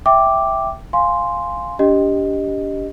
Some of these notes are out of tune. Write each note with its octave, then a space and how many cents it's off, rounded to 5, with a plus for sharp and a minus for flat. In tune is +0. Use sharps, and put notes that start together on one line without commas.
E5 +0 G5 +0 D6 +0
F5 +0 G#5 +0 C6 +0
D4 -40 G4 +0 D#5 -5